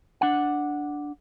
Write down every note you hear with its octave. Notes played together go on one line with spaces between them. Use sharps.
D4 F#5